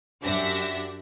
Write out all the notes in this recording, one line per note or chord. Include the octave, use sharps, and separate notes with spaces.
F#2 D4 G4 E5 F#5 A#6